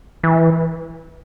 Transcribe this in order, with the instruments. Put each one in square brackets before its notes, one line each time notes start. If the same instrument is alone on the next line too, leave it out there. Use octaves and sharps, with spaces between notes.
[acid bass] E3